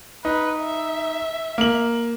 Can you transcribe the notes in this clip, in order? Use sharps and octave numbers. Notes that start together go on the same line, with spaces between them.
D#4 B4
E5
A#3 F#7